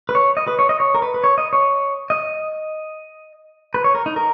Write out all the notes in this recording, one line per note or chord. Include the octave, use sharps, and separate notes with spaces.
B4
C#5
D#5
B4
C#5
D#5
C#5
A#4
B4
B4
C#5
D#5
C#5
D#5
B4
C#5
A#4
D#4
A#4